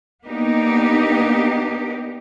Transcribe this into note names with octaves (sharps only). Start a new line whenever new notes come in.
A#3 B3 D4 D#4 G4